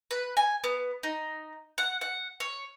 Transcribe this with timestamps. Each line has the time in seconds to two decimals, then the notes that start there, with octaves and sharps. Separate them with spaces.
0.11 B4
0.37 G#5
0.64 B3
1.03 D#4
1.78 F#5
2.01 F#5
2.40 C#5